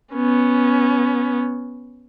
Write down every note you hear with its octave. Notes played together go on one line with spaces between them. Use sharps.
B3 C#4